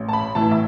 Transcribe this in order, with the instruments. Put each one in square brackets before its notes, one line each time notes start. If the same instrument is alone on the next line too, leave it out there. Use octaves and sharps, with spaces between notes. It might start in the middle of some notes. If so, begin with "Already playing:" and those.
Already playing: [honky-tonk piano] A1
A5
B5
A2 E3 A5
E5